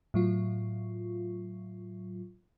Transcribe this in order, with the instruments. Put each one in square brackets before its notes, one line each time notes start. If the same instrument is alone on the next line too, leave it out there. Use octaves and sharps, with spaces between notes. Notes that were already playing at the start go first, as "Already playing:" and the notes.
[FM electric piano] A2 F#3 F4